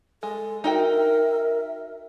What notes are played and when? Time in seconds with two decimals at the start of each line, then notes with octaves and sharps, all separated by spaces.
0.23 G#3 A4
0.64 D#4 F#4 A#4 E5 G5